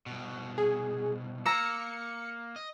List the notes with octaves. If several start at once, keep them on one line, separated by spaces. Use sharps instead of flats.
C2 B2
G#4
A#3 A#5 E6 C#7
D#5